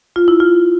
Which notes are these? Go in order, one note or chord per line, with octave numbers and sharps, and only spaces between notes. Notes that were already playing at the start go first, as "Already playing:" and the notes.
F4
E4
F4